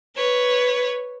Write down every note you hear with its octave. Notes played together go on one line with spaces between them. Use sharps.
B4 C#5